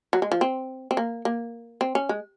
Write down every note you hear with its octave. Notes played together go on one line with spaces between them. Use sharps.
F#3
G#3
F3
C4
C4
A#3
A#3
C4
C#4
G#3